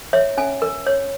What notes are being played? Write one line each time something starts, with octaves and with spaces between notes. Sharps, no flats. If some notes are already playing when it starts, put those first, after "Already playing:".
C#5 E5
C#4 G#5
A#4
C#5